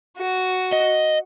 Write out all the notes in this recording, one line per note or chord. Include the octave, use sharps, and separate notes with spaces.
F#4
D#5